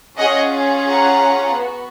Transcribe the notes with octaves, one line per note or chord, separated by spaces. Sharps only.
C#4 F4 G#4 D#5 F#5
F#5 A#5
B3 F#4